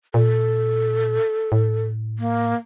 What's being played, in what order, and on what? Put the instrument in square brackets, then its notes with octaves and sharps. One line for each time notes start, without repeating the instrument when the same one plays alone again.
[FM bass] A#2 [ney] A4
[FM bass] A2
[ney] A#3